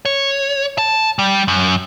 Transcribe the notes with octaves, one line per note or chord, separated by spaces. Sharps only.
C#5
A5
G3
F#2